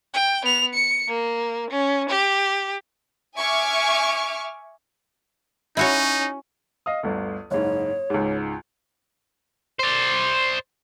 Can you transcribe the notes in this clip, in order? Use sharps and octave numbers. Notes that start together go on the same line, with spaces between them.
G5
B3 F7
C#7
A#3
C#4
G4
E5 G#5 C#6 D6 F6
C#4 D#4 E4 F#4 C#5
D#5 F5 D#6
G1 D2
F#1 G#2 C#5
C#2 G#2
C5 D5